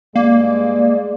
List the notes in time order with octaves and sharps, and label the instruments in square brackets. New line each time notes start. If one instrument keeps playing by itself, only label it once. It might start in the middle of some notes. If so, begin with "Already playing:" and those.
[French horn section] G2 G#3 D5 [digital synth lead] A#3